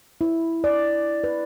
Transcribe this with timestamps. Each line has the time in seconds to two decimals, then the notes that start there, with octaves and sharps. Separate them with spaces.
0.21 E4
0.64 D5
1.24 B4